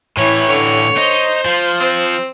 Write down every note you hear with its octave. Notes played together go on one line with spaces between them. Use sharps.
A2 E3 E4 C#5
D3 C#5
D#4 C5
F3
C4